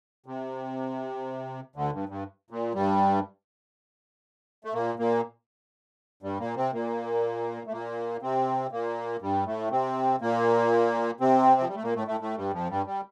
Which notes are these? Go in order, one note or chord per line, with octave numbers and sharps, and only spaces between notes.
C3
D2 D3
G2
G2
A#2
G2 G3
A3
A#2 A#3
A#2 A#3
G2 G3
A#2 A#3
C3 C4
A#2 A#3
A3
A#2 A#3
C3 C4
A#2 A#3
G2 G3
A2 A3
C3 C4
A#2 A#3
C3 C4
F3
G3
A3
A#2 A#3
A2 A3
A2 A3
A2 A3
G2 G3
F2 F3
G2 G3
G3